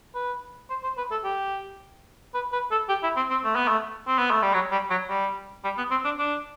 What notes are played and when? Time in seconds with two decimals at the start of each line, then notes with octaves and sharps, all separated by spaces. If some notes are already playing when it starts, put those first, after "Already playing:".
0.15 B4
0.70 C5
0.83 C5
0.97 B4
1.11 A4
1.24 G4
2.34 B4
2.53 B4
2.71 A4
2.89 G4
3.03 E4
3.16 C4
3.31 C4
3.44 A3
3.56 B3
3.68 A3
4.07 C4
4.18 B3
4.31 A3
4.42 G3
4.54 F#3
4.72 G3
4.90 F#3
5.09 G3
5.64 G3
5.78 B3
5.91 C4
6.05 D4
6.19 D4